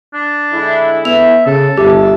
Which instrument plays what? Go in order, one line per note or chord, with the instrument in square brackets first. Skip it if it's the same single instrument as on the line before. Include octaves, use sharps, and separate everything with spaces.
[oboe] D4
[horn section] D3 G#3 E4
[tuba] B3 [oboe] E5 [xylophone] F7
[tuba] C#3 [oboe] A4
[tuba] G1 [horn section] E4 E5 A5 [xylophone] G4